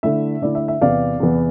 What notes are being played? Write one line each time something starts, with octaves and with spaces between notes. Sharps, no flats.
D3 A3 E4 E5
D3 A3 E4 D5
E5
E5
E2 C3 E3 B3 D5 F5
E2 C3 E3 B3